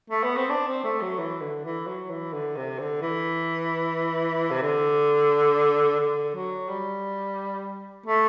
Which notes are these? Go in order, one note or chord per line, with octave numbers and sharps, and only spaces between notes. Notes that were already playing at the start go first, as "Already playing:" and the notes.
A3
B3
C4
D4
C4
A3
F#3
E3
D3
E3
F#3
E3
D3
C3
D3
E3
C3
D3
D3
F#3
G3
A3